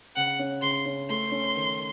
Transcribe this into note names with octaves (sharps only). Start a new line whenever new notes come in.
C#3 F#5
C#4
C#3 C6
C#4
A3 C6
C#4
D#3